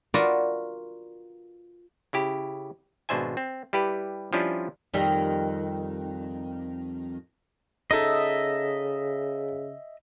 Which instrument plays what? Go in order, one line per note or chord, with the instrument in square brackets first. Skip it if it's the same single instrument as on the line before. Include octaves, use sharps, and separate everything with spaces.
[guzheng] F4 F#4 A#4 B4 D5
[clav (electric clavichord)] C#3 E4 G4
G#1 B2 D4 C5 E5 G#5
C4
G3 E4 G4 B4
F3 G3 C#4 D4 E4 F4
[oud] F2 D#3 G3
[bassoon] C#3 [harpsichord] D#4 A4 [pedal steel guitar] D#5 E5